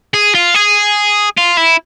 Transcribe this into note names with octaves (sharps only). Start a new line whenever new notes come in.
G#4
F4
G#4
F4
E4